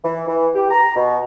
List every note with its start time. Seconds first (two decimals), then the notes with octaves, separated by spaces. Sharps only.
0.04 E3
0.28 E3
0.55 G4
0.71 A#5
0.96 B2